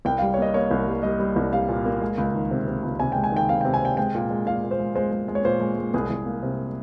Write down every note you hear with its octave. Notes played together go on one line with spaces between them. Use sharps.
C2 G5
G3 F5
C#5
A#3 D#5
A#3 C#5
C2
G3
G3 D#5
G3
C2
G3 F5
A#2
A#3
G#3
C#2
D#3
C3
C3
C#2
C3 G#5
G#3 G5
G#5
D#3 G5
C3 F5
C3 G5
G#5
C3 G5
G#3 G5
A#2
G#3
A#2 F5
A#2
C5
G#3
G#3 C5
G#3
G#3
C#5
A#2 C5
G#3
G#3
C2 G#4
C2
A#3
C3